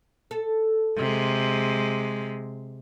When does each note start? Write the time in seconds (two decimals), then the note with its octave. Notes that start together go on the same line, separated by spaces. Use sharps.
0.31 A4
0.97 C3 G#3